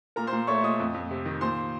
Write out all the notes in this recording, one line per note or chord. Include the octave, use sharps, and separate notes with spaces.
A#2 A#4 A#5
C5 C6
A#2
A3 C#5 C#6
A#2 D#5 D#6
F2
F2
C3
D#3
A#2 C5 C6